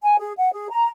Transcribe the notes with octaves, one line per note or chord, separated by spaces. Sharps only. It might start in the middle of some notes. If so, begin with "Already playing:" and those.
G#5
G#4
F#5
G#4
A#5